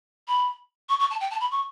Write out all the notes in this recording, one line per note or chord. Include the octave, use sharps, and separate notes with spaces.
B5
C#6
C#6
A5
G5
A5
B5
C#6